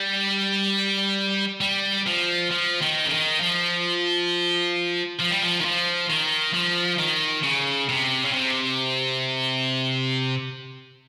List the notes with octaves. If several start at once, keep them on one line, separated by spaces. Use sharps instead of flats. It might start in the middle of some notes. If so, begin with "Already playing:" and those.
Already playing: G3
G3
F3
F3
D#3
C#3
D#3
F3
F3
G3
F3
D#3
F3
D#3
F3
D#3
C#3
C3
C#3
C3